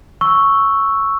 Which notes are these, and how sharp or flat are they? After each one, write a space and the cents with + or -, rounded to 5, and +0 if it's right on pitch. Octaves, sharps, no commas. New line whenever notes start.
C#6 +0 E6 +0